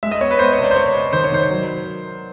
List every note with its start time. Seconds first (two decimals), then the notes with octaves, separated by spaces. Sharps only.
0.03 G#3 E5
0.11 D#5
0.21 B3 C#5
0.31 B4
0.39 B3 C5
0.53 C#5
0.58 C3
0.64 D5
0.71 C5
0.76 C3 C#5
0.95 C3
1.13 D#3 C5
1.24 C#5
1.32 D#3 C5
1.50 F#3